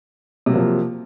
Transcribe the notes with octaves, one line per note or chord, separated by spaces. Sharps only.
C3 F3 F#3 A#3